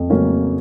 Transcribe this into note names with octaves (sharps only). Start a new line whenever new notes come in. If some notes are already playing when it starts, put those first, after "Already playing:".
Already playing: F2
C#3 F#3 A#3 C#4